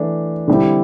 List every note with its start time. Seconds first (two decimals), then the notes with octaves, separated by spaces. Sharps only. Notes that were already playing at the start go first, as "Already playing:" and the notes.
Already playing: E3 A3 D4
0.48 D3 G3 C4 E4 G4